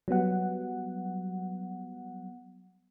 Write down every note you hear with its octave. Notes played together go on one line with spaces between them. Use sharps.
F#3 G3 B3 F#5